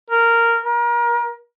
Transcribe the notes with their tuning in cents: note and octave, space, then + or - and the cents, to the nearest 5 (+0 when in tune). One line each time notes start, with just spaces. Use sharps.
A#4 -10
A#4 +35